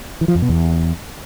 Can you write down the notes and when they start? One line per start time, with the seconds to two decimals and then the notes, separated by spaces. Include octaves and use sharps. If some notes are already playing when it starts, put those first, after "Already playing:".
0.21 E3
0.28 F3
0.35 F2
0.42 B2
0.49 E2